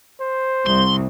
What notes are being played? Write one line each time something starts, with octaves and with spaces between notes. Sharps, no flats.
C5
C2 C6